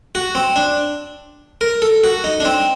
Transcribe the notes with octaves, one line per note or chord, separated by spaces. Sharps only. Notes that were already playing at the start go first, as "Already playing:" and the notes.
F#4
C4
D4
A#4
A4
F#4
D#4
D4
C4